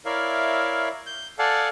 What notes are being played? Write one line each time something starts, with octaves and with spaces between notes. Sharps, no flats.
E4 A#4 C#5 D5 E5 F5
G6
A4 D5 F5 F#5 G#5 A5